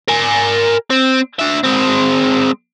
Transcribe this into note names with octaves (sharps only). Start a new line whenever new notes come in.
A#4 G#5
C4
D4 E5
G#3 C4